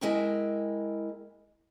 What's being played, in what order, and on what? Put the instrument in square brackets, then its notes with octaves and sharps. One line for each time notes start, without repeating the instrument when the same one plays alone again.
[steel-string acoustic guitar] G#3 E4 A#4 G5 A5 A#5